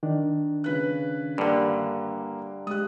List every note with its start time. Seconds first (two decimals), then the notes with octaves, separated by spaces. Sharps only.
0.03 D#3 D4
0.64 C#3 B4 F#6
1.38 G2 D3 A#3
2.67 G#3 G4 D#6 F#6